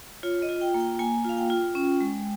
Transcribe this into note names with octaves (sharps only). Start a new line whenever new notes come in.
F4 C#5
D#5
F4
G5
A#3
G5
A#3 G#5
F4 F5
G5
F4
C#4
G#3